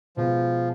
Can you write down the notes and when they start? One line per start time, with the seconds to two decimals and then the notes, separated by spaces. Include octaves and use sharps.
0.17 B2 F3 G#3 B3